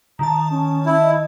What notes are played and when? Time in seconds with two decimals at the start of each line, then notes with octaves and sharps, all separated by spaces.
0.19 D#3 A5 A#5
0.51 C#4
0.86 E4
1.02 D#5